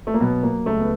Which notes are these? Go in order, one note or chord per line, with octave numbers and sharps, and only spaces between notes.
A3
A#3
B2 F#3 B3
A#3
C#2 A3
B3